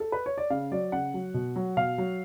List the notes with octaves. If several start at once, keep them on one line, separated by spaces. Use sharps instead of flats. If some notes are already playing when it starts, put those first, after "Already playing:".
A4
B4
C#5
D5
C#3 F5
F#3 D5
C#3 F#5
F#3
B2
F#3
B2 F5
F#3